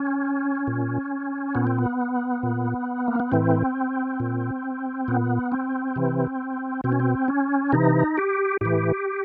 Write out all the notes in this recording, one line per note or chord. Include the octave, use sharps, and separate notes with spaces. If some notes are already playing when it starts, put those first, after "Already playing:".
Already playing: C#4
A#2
A#2 B3
C4
B3
A#2
A#3
B3
A2 E3 C4
A#2
A#2 B3
C4
C3 E3
B2 C4
C#4
C4
C#4
C3 E3 D#4
G4
A2 E3 G4